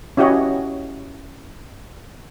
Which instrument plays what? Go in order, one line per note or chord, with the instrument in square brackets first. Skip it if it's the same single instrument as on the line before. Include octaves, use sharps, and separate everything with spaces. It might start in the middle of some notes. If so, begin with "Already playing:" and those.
[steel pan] C#4 E4 F#4 G4 C#5 D#5